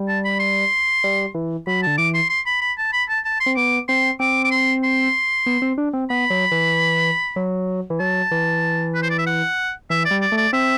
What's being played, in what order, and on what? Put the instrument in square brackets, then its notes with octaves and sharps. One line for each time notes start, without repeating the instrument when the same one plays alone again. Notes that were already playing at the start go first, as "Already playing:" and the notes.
Already playing: [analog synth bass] G3
[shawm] A5
B5
C6
[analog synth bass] G3
E3
[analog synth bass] F#3 [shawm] B5
[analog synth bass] D3 [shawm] A5
[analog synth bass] E3 [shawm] D6
[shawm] C6
C6
B5
B5
A5
B5
A5
A5
C6
[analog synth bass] C4
[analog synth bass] B3 [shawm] D6
[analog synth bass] C4 [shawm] C6
[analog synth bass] C4 [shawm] D6
[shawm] D6
C6
C6
[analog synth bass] B3
C4
D4
C4
[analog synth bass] B3 [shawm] B5
[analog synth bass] F#3
E3
F#3
E3
[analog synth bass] F#3 [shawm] A5
[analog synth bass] E3
[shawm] B4
C5
D5
E5
F#5
[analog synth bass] E3 [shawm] E5
[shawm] D5
[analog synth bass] G3
[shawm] D5
[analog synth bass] A3
[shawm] D5
[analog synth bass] C4 [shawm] E5